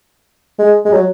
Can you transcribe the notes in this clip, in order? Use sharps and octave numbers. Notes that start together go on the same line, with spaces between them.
G#3
G#3
F#3